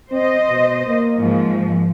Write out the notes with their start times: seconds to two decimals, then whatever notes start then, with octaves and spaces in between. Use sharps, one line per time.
0.12 C4 C5 D#5
0.50 B2
0.87 A#3
1.18 G#2 F3